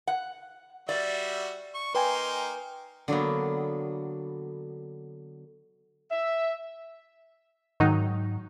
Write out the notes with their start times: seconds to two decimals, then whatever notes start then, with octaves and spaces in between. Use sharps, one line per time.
0.07 F#5
0.89 G3 F#4 D5 E5
1.74 C#6
1.95 A#3 D#4 B4 G5 G#5 C6
3.08 D3 F#3 A#3 B3
6.10 E5
7.80 G#2 D#3 F#3 D#4